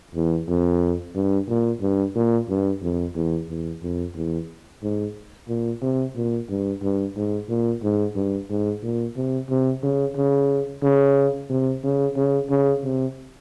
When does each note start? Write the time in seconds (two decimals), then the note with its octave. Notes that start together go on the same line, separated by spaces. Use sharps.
0.15 E2
0.48 F2
1.15 G2
1.49 A#2
1.81 G2
2.16 A#2
2.49 G2
2.82 F2
3.15 E2
3.49 E2
3.82 F2
4.15 E2
4.83 G#2
5.48 A#2
5.82 C3
6.16 A#2
6.49 G2
6.82 G2
7.16 G#2
7.49 A#2
7.83 G#2
8.16 G2
8.50 G#2
8.83 A#2
9.16 C3
9.49 C3
9.83 C#3
10.16 C#3
10.83 C#3
11.50 C3
11.84 C#3
12.16 C#3
12.50 C#3
12.83 C3